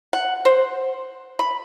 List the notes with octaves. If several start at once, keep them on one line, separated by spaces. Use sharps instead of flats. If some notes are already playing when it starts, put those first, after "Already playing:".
F#5
C5
B5